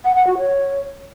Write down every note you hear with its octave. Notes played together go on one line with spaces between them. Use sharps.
F#5
F#5
F#4
C#5